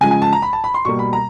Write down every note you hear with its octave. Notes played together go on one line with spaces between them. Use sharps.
C#3 F3 G#3 G#5
G#5
A5
A#5
B5
A5
B5
C6
B2 G3 A#3 C#6
B5
A#5